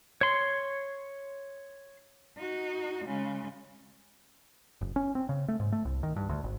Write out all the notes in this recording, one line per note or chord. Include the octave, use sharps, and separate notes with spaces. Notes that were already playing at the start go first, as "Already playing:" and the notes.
C#5 C6
D#4 F#4
C#3 G#3
F#1
C#4
C4
C#3
A3
G#2
A3
C2
D#3
G2
D2
G#1